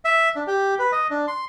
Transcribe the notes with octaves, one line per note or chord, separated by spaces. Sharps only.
E5
D4
G4
B4
D#5
D4
C6